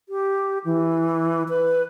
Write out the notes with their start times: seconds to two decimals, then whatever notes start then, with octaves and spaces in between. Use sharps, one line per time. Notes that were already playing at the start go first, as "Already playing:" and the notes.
0.09 G4
0.65 E3
1.49 B4